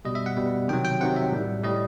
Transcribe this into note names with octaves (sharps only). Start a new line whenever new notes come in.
B2 G3 D#5
E5
F#5
B2 G3
C3 D#3 F#3 G5
G5
C3 D#3 F#3 F#5
E5
A2 G3
A2 G3 D#5